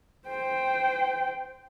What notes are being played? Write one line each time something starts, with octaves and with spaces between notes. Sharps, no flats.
C5 G5